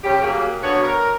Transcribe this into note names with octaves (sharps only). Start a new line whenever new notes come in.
C#3 C#4 G4
F#3 A#3 G4 G#4
D3 B3 F#4 C#5
A#4